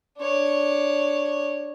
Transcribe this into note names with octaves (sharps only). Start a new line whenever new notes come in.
D4 C#5